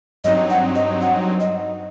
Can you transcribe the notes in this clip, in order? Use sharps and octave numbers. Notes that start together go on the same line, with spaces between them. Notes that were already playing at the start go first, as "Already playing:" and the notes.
G2 F#3 C4 D#4 D#5
F#5
D#5
F#5
D#5